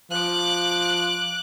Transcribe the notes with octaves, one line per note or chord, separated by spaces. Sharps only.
F3 D6 F#6